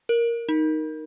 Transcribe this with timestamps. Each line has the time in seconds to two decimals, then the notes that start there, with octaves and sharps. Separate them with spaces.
0.09 A#4
0.49 D#4